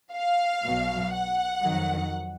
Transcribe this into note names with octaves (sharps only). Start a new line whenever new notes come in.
F5
B1 B2 F#3
F#5
F2 D#3 F#3